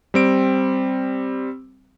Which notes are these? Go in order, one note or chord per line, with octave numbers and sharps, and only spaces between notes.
G3 C4 D7